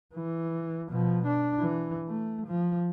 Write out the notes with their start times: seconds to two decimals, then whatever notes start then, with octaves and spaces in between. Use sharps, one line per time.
0.15 E3
0.89 B2 F3
1.26 D4
1.59 E3
2.08 A3
2.47 F3